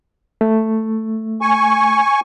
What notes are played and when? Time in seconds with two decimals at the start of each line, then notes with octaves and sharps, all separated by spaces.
0.41 A3
1.41 G#5 C#6